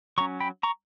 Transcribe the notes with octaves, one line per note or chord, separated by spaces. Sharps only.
F#3 C#4 A#5 C#6
G5 B5
A#5 C#6